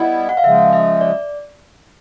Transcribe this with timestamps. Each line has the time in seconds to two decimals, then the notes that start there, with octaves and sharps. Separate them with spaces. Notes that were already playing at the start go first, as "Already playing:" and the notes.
Already playing: G3 B3 E4 D#5
0.29 F#5
0.37 F5
0.44 C#3 F3 G#3 E5
0.73 E5
1.01 D5